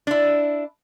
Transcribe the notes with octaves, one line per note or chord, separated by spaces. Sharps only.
D4 E4